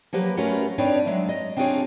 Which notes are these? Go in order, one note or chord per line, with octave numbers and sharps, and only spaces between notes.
F3 F#3 A#3 G4 B4
A3 C#4 F4 F#4 A#4 B4
C4 D4 D#4 B4 C#5 D5
F#3 G#3 D4 E5
D#5
C4 D4 D#4 F4 G#4 C#5